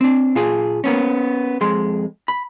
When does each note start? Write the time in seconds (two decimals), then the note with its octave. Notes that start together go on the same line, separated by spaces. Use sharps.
0.01 C4 D4
0.35 A#2 F4 G#4
0.84 A#3 B3 C#4
1.61 F2 G#3 C6
2.28 B5